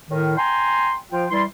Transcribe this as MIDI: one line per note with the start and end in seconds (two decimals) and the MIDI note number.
0.09 0.35 45
0.09 0.35 51
0.37 0.93 79
0.37 0.93 80
0.37 0.93 82
0.37 0.93 84
1.12 1.25 53
1.12 1.25 65
1.12 1.25 79
1.30 1.43 52
1.30 1.43 55
1.30 1.43 64
1.30 1.43 84